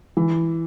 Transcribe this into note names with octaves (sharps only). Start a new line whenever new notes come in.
E3